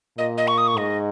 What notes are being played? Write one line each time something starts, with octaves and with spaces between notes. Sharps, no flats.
A#2 D#5
D#5
C#6
D#6
C#6
G#2 D#5